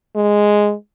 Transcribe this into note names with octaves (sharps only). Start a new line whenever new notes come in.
G#3